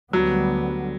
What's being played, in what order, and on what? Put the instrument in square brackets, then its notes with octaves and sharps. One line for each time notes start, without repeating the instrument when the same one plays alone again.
[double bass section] D2 D3 G3 B3 [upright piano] F#3